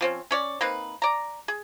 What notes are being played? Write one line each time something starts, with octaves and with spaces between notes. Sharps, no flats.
F3 C4 C#4
C#4 C#5 D5
A#3 C4 D#4 B4
D5 A#5
G#4